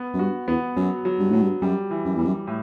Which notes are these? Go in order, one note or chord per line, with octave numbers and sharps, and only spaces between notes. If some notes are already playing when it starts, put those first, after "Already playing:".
Already playing: B3
F#2
G2 F#4
E2 B3
F#2 F#3
F#3
G2
A2 F#3
G2
F#2 G3
E3
F#2
E2 G3
F#2
A2